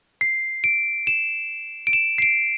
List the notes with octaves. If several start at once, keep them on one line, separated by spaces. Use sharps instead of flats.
C7
D7
E7
D7
E7
C7
D7